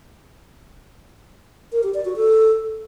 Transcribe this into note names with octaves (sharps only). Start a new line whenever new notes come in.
A#4
G4
D5
F#4
A4